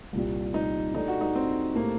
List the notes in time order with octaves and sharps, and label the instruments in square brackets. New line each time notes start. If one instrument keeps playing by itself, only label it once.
[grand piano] C2 A#2 G3
[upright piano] D#4
[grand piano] A#2 G3 D4 A4 [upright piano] D#4
[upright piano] F#4
D#4
C4
[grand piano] A2 A3 C4 G4 [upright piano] A#3